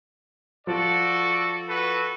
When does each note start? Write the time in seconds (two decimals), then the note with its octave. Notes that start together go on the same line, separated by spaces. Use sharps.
0.67 F3 F#4 A4 D5
1.67 F#4 A4 B4